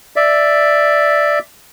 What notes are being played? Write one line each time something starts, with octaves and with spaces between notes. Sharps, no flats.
D5 E5